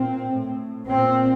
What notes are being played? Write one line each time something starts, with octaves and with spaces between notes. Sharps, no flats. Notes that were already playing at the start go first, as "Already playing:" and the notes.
Already playing: A#2 C4
A2
A#2 C4